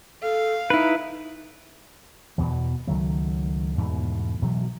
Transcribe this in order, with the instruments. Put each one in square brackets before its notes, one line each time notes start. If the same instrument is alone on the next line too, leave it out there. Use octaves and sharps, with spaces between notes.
[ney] A4 [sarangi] F5
[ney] D#4 [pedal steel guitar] E4 B4
[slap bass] E2 B2 E3
C#2 D#3 F#3 A3
E2 G#2 B2 A3
B2 E3 F#3 A3